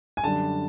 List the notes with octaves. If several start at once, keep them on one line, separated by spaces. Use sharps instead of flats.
G#5
F#2 D3 G3 A5